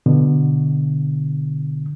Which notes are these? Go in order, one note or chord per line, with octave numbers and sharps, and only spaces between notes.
B2 D3